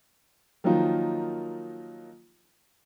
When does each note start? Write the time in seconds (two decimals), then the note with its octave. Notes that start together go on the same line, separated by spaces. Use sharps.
0.64 D#3 F3 F#3 A#3 D#4 F4